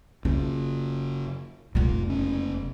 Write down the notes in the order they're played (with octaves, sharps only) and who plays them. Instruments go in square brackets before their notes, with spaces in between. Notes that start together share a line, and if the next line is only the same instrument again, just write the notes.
[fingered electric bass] F#1 C#3 [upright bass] F4
[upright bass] F1 B3 [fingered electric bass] A#2
[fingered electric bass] F#1 C#4